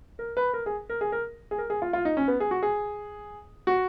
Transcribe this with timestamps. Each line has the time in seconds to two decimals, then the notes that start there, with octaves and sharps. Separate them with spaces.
0.19 A#4
0.37 B4
0.53 A#4
0.66 G#4
0.89 A#4
1.01 G#4
1.12 A#4
1.51 G#4
1.58 A#4
1.70 G#4
1.82 F4
1.93 F4
2.05 D#4
2.17 C#4
2.28 B3
2.40 G#4
2.51 F#4
2.63 G#4
3.67 F#4